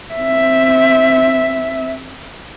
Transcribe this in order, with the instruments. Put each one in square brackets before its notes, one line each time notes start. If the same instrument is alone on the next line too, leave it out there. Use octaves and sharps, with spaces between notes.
[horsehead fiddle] C4 E5